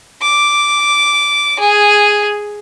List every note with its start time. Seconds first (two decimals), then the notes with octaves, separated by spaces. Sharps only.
0.22 D6
1.60 G#4